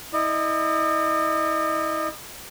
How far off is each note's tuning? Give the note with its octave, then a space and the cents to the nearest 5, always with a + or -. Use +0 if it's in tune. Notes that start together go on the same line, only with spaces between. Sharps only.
E4 -35 D#5 -40